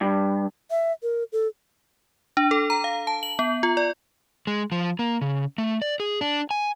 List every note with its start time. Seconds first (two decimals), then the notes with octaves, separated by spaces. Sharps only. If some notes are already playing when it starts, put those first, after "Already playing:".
0.01 G2
0.71 E5
1.03 A#4
1.32 A4
2.37 D4
2.51 A4
2.70 A#5
2.84 F5
3.07 A5
3.23 F#7
3.39 B3
3.63 F4
3.77 D5
4.47 G#3
4.72 F3
4.99 A#3
5.22 C#3
5.58 A3
5.82 D5
6.00 G#4
6.21 D4
6.51 G#5